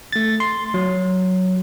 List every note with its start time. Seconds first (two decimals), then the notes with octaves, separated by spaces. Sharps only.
0.13 A3 A6
0.40 C6
0.74 F#3